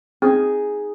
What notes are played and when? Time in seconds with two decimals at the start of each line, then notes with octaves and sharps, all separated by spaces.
0.22 C4 D#4 G#4